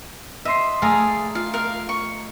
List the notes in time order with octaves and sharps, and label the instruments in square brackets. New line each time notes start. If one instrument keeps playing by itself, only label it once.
[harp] D#5 C6 C7 [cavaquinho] E5
[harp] A3 A#5 D#6 [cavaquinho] G#4 D5 F5
[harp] F4 [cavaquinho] F5
[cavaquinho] A#4 F5
C#6